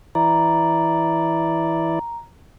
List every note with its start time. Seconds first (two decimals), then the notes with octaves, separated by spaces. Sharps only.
0.15 E3 E4 D5 A#5